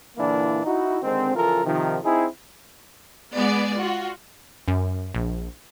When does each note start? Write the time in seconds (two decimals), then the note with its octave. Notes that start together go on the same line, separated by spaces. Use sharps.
0.16 A#2 D3 E3 A#3 D4 E4
0.64 D#4 E4 F#4
1.02 D3 D#3 G#3 C4
1.34 C#3 E3 F3 F4 A4 A#4
1.64 C3 D#3 F3
2.03 C4 D#4 E4 G#4
3.35 G#3 B3 G#4 D5
3.78 F4 F#4
4.68 F#2
5.15 A#1